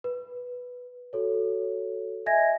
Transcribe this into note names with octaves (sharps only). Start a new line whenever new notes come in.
B4
F#4 A4 C#5
D#5 E5 G#5 G#6 A#6